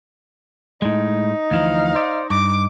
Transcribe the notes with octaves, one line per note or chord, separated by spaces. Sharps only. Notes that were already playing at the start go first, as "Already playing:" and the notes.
A2 G#3 D#4
D2 E3 F3 F5
C5 D5
G2 D6